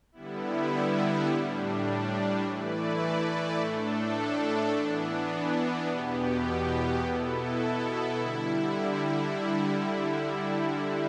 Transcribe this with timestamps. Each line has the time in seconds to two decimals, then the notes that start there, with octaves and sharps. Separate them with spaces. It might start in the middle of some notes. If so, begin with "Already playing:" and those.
0.12 D3 G3 B3 E4
1.27 A2 G3 D4
2.43 E3 A3 E4 B4 D5
3.57 A2 A3 D4 A4
4.72 E3 B3 D4
5.86 E2 B2 B3 G4
7.02 B2 B3 E4 A4
8.17 D3 G3 E4